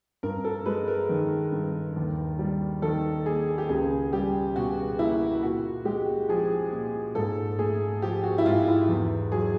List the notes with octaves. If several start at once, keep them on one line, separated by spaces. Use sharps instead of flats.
G2 A#4
A4
G#3 B4
A#4
D#3
G2
D#2
G3
D#3 A4
A#3 G#4
G4
C#2 G#4
G3 G4
B2 F#4
A#3 E4
A#2 F#4
G#3 G4
F3 G#4
A#2
G#2 A4
A3 G#4
F3 G4
F#4
E4
G#2 F4
E4
E2
F#3 G#4